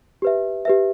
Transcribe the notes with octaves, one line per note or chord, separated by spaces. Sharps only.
G4 B4 E5
G4 B4 E5